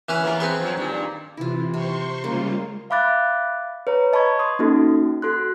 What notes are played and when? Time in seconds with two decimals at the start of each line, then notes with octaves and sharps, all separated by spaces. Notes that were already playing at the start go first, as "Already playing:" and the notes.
0.09 E3 C#4 B4
0.24 A#3 B3 A#4
0.40 C4 G#4 B4
0.60 F3 F#3
0.77 G2 A#2 D#3
1.37 C3 E3 E4 F4
1.74 C3 C5 C6 C#6
2.24 C#3 G3 G#3 A#3 F4
2.90 E5 F5 B5 D6 F#6 A6
3.87 B4 C#5 A#5
4.13 D#5 A5 B5 C#6 G#6
4.39 C6 D#6
4.59 A#3 C#4 D#4 F#4 A4
5.22 F#4 A4 C6 F#6